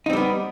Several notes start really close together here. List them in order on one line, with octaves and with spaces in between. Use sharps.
D#4 C4 G3 B3